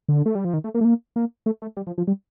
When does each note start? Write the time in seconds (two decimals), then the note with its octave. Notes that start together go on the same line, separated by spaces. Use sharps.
0.09 D3
0.26 A3
0.35 G3
0.45 F3
0.54 D#3
0.64 A3
0.75 A#3
0.81 A3
0.85 A#3
1.16 A#3
1.46 A3
1.62 A3
1.77 G3
1.87 F3
1.98 F3
2.07 G3